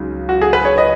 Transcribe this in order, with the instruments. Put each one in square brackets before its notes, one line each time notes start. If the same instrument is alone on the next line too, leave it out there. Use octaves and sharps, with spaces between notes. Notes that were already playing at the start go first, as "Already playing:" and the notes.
Already playing: [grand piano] C#2 C#3 F#3 D#4
[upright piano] F#4
G#4
B4
C#5
D#5